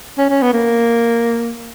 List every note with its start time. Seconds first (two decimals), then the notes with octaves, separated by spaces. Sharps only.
0.18 C#4
0.30 C#4
0.42 B3
0.53 A#3